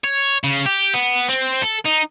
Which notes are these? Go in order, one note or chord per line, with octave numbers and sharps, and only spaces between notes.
C#5
C#3
G4
B3
C4
A4
D#4